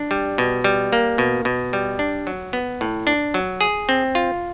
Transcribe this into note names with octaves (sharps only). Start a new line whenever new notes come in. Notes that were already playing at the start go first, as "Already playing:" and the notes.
Already playing: D4
G3
B2
G3
A#3
B2
B2
G3
D4
F#3
B3
A2
D4
F#3
G#4
C4
F4